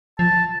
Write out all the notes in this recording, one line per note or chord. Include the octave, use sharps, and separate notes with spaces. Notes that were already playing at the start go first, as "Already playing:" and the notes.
F3 A5